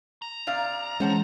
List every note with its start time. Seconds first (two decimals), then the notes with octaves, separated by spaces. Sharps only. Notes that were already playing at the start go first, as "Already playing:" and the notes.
0.22 A#5
0.47 C3 D5 F5
1.00 E3 G#3 C#4 C5 F#5 A5